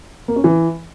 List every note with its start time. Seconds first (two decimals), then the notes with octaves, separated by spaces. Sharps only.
0.28 A#3
0.36 C#4
0.44 E3